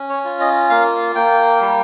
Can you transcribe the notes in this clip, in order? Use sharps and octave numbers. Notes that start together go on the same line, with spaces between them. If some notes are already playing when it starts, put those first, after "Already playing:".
Already playing: C#4
C#5
F4
D#5
A#3 F5
A#3 G5
G3